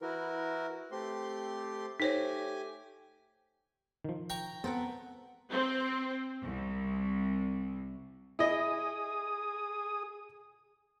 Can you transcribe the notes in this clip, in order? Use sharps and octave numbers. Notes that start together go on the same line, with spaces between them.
E3 E4 F#4 A#4
A3 C4 G4 C6
A3 D#4 G4 C5 C#5 G#5
D#3 F3
G5 A#5 C#6
B3 C4 A4 A#4 C5 F#5
C4
C2
E4 G#4 D#5 D#6